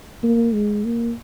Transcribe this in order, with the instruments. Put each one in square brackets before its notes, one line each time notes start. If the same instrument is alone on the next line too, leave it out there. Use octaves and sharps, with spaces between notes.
[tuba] A#3
G#3
A#3